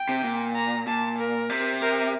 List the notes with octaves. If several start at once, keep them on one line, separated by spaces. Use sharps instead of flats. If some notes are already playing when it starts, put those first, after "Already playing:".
Already playing: G5
C3
A#2
A#5
A#2 A5
A#4
C3
A#4